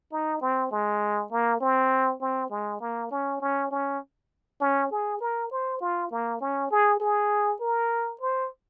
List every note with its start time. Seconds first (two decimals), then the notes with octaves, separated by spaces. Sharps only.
0.12 D#4
0.41 C4
0.71 G#3
1.32 A#3
1.61 C4
2.21 C4
2.50 G#3
2.80 A#3
3.11 C#4
3.41 C#4
3.71 C#4
4.61 C#4
4.91 G#4
5.21 A#4
5.51 C5
5.81 F4
6.11 A#3
6.41 C#4
6.71 G#4
7.00 G#4
7.61 A#4
8.21 C5